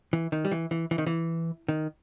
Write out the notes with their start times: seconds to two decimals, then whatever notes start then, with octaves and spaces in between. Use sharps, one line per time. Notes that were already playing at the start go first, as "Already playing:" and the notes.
0.13 E3
0.32 D#3
0.45 G3
0.52 E3
0.71 E3
0.91 E3
0.98 D#3
1.06 E3
1.68 D#3